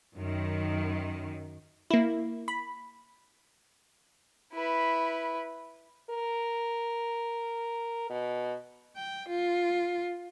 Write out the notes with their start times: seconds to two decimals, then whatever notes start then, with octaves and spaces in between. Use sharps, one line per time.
0.15 F#2 D#3
1.90 A#3 E4
2.48 B5
4.53 E4 B4
6.10 A#4
8.10 B2
8.96 G5
9.29 F4